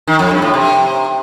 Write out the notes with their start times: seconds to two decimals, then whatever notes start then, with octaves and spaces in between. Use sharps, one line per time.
0.07 D#3
0.19 F2
0.31 G2
0.42 A2
0.54 C3